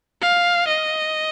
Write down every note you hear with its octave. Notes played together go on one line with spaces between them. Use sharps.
F5
D#5